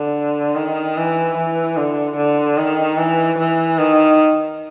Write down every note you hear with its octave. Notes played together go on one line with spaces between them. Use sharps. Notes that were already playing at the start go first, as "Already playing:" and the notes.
Already playing: D3
D#3
E3
E3
D3
D3
D#3
E3
E3
D#3